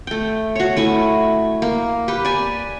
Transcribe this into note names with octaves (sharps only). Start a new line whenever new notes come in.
A3 G5
F#4 C#5
A3 E4 G#5
A#3
G4 B4
D5 G#5